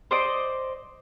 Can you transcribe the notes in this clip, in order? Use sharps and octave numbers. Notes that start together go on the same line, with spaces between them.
C5 D5 D#5 D6